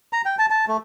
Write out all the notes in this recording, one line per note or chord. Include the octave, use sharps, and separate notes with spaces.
A#5
G5
A5
A5
A3